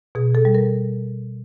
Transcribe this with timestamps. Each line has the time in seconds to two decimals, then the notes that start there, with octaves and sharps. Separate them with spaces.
0.15 B2 G#4
0.35 A4
0.45 G3
0.55 A#4